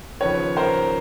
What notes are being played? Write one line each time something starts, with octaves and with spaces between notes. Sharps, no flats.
D#2 C#3 F3 B4 C#5
A#4 C5